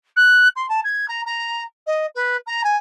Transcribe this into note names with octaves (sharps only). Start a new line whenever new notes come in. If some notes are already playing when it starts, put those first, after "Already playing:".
F#6
C6
A5
G#6
A#5
A#5
D#5
B4
A#5
G#5